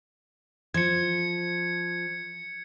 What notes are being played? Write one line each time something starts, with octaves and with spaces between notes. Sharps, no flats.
F3 G#6 C#7